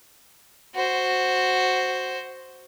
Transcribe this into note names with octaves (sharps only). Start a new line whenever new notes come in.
F#4 C5